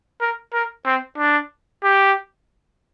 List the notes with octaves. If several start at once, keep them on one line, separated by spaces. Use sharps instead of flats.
A#4
A#4
C4
D4
G4